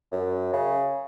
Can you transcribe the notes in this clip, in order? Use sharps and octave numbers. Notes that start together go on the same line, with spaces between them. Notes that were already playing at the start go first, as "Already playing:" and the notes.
F#2
C#3